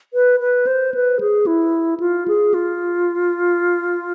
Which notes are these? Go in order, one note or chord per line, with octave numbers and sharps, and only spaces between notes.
B4
B4
C5
B4
G#4
E4
F4
G#4
F4